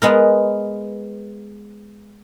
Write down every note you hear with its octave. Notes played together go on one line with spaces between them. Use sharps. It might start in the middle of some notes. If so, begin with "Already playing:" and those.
G#3 B3 A#4